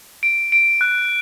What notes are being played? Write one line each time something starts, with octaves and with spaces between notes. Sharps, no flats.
D7
D7
F#6